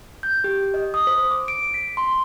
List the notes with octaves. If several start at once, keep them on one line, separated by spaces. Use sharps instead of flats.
G6
G4
D#5
D#6
C5
D6
D7
B6
C6